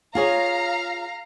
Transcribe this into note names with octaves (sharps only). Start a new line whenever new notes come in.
F4 G#4 C#5 F5 A#5